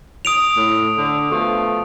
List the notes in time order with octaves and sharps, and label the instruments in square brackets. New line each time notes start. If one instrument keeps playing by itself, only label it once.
[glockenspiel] D#6 D7 F7
[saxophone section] A2
D3
B2 F3 A3